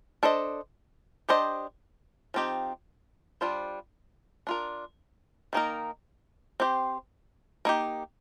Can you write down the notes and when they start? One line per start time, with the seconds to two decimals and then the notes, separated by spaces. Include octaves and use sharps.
0.23 D4 A4 C5 D#5
1.29 D4 G4 C5 D#5
2.34 F3 C4 D#4 G4
3.41 G3 D4 F4 C5
4.47 D4 F4 A#4
5.53 D#3 A#3 D#4 A#4
6.60 C4 G4 C5
7.65 A#3 D#4 G4